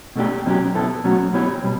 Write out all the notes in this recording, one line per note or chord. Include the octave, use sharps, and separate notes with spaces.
B2 A3 D4 G4
B2 F#3 C#4 G4
B3 E4 A4
B2 F#3 A3 C#4 F#4
B3 E4 G4 C#5
B2 G3